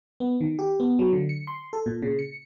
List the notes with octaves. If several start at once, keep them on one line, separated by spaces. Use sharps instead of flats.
B3
D#3
G4
B3
F#3
D3
C#7
C6
A4
A#2
C#3
C#7